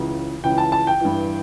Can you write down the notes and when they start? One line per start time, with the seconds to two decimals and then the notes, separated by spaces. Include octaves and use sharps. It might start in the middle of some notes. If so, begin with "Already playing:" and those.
Already playing: C#2 C#3 E3
0.44 C#2 C#3 E3 G5
0.58 A5
0.72 A5
0.87 G5
1.01 G2 E3